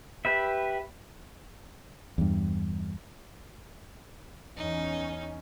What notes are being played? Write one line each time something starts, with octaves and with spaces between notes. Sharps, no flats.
G4 B4 E5
E2 G2
E2 C#4 D#4